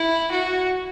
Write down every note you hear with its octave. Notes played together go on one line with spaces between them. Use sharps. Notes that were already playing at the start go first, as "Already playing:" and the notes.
Already playing: E4
F#4